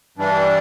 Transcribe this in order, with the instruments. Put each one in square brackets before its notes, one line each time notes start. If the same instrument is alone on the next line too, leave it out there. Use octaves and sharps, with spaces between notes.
[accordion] G2 E3 G3 D4